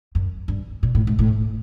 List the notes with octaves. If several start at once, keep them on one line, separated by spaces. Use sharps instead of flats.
F#2
G2
A#2
A2
G#2
A2